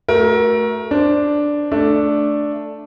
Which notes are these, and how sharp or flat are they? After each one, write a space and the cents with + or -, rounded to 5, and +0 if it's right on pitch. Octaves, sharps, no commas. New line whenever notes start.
A3 +0 F#4 +10 A#4 +25
D4 +0 C5 +0
A3 +0 D4 +0 D5 +0